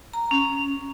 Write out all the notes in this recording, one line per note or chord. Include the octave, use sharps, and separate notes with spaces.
A#5
C#4